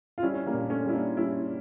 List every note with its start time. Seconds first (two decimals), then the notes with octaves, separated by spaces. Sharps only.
0.18 F4
0.22 G3 C#4 E4
0.34 C#4
0.46 G3 A#3
0.54 A#2
0.62 D4
0.70 A3 C#4
0.86 G3 E4
0.93 A#3 D4
1.17 G3 C#4 E4